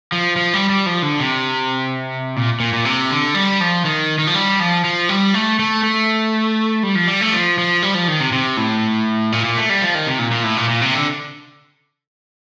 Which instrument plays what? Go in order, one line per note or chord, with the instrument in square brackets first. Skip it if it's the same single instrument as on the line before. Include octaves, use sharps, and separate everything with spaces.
[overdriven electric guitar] F3
F3
G3
G3
F3
D3
C3
A#2
A#2
A#2
C3
D3
G3
F3
D#3
D#3
F3
G3
F3
F3
G3
A3
A3
A3
G3
F3
G3
A3
F3
F3
G3
F3
D#3
C3
C3
A2
A#2
A#2
A3
G3
F3
D#3
C3
A#2
A#2
A2
A#2
A#2
C3
D3